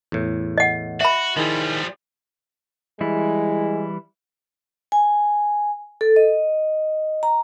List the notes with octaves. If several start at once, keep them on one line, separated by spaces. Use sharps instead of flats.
E2 A2
D#5 F#5
F#4 E5 B5
D#3 F3 G3 E4 G#4
E3 G3 G#3 E4
G#5
A4
D#5
A#5